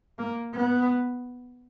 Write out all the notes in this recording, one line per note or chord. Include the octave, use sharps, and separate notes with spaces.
A#3
B3